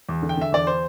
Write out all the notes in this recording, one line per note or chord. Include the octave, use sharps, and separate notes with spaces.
E2
D3
G5
D3 E5
E2 D5
C5